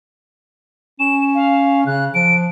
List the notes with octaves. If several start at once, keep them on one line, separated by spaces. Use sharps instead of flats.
C#4 E7
F5
C#3 F#6
F3 D7